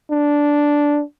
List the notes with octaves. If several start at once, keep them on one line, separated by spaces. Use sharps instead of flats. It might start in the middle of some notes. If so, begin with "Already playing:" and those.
D4